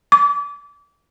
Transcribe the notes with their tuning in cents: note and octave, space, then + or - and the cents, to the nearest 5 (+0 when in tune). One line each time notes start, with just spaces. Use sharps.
D6 -30